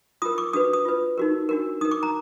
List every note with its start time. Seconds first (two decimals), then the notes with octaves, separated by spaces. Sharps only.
0.22 F4 A#4 D#6
0.38 D6
0.53 D4 F#4 B4 D#6
0.73 D#6
0.85 F4 B4
1.18 D#4 F#4 A#4
1.49 D4 F#4 A#4
1.81 D#4 A#4 D#6
1.91 D6
2.03 A#5